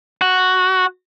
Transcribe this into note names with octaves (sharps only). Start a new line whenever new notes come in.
F#4